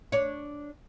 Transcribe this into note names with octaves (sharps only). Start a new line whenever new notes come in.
D4 C#5